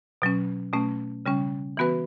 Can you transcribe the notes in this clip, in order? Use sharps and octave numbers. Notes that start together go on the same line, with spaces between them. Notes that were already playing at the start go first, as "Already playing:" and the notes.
B2 F#3 C#4
B2 A3 C#4
C#3 G3 C#4
E3 B3 F#4 B4